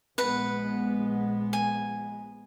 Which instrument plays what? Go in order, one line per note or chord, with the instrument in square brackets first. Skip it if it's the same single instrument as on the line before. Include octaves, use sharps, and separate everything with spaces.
[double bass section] A#1 G#3 B3 [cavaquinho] B4 F#5
[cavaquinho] G#5